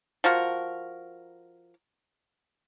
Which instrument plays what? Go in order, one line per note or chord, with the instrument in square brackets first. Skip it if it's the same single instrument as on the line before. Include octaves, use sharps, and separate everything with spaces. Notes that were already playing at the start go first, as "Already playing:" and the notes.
[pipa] F3 F#4 A#4